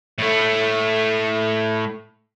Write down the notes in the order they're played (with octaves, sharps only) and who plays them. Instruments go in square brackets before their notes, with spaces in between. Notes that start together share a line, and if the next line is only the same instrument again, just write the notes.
[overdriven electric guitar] A2 A3